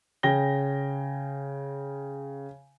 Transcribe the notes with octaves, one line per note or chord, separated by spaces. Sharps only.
C#3 G5 A#6 G7